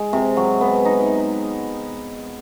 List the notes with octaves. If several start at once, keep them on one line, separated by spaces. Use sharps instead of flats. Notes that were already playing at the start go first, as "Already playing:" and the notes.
Already playing: G#3
C3
F#3
B3
D#4